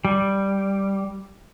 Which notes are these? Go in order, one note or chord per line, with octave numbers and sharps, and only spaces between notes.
G3